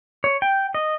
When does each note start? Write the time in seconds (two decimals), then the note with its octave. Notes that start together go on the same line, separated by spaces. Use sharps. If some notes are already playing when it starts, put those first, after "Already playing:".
0.24 C#5
0.42 G5
0.74 D#5